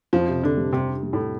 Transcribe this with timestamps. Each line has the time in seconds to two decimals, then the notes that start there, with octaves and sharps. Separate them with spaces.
0.13 F2 F3
0.28 C3
0.43 D3 D4
0.57 G3
0.73 C3 D4
0.88 D4
1.03 G3
1.13 A2